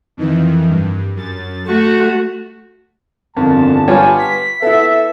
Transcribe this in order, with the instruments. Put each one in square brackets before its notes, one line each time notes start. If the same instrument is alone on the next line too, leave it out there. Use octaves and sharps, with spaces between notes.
[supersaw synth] F2 D#3 E3
G2
F#2 A6
[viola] A3 F#4 [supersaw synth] C#6
[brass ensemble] G1 D3 A5 [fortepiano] F2 [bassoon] D#3
[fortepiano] G3 F4 C#5 [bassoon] B3 [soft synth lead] G#5
[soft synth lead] B6
[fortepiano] B3 E4 [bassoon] A4 [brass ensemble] E5